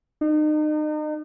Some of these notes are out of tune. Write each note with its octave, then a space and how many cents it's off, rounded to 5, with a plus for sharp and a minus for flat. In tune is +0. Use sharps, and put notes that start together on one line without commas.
D#4 -35